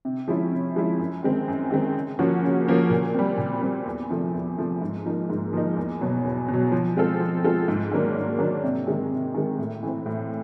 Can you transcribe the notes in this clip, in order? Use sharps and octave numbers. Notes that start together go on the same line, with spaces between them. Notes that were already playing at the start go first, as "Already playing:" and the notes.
C3
F3 G#3 C#4 E4
C3
F3 G#3 C#4 E4
F#2
D#3 G#3 C4
F#2
D#3 G#3 C4
C#3
F3 A#3 C#4 F#4
C#3
F3 A#3 C#4 F#4
A#2
G3 C4
A#2
G3 C4
E2
C3 F3 A3
E2
C3 F3 A3
G#2
F3 A#3 D#4
G#2
F3 A#3 D#4
E2
B2 F#3
E2
B2
F#3
F3
G#3 C4 F4 A4
F3
G#3 C4 F4 A4
G#2
D#3 F#3 A#3 D4
G#2
D#3 F#3 A#3 D4
C3
D#3 G#3
C3
D#3 G#3
A2
E3 A3 C4
A2